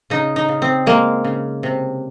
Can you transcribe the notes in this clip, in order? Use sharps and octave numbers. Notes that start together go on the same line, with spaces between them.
C#3 D#4
D#4
C#3
C4
G#3 A#3
C#3
C3